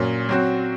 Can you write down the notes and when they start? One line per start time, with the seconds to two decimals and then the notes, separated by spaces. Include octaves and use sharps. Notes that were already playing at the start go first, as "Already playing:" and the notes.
Already playing: A#2 F#3 C#4
0.29 F#3 C4 F#4